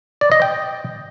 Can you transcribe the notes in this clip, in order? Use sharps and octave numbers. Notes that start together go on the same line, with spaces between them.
D5
D#5
G5